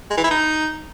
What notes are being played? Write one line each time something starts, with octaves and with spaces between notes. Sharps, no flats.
G#3
E3
E4
D#4